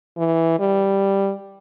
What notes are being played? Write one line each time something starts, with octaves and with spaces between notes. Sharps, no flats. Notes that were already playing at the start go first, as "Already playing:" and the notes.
E3
G3